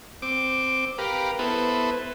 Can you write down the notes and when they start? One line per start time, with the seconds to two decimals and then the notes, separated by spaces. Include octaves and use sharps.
0.22 C4 D6
0.98 G4 A#4 B4 F5
1.39 B3 E4 A4 B4 C5